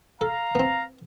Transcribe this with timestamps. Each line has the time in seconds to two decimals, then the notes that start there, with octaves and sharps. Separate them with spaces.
0.21 A4 F5 A#5
0.55 B3 C4